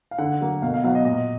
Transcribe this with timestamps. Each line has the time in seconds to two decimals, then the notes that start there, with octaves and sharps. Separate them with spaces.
0.11 F5
0.18 D3 F#5
0.41 F#3 A#3
0.62 B2 F5
0.74 F5
0.84 F#3 B3 F5
0.95 D#5
1.05 A#2 D#5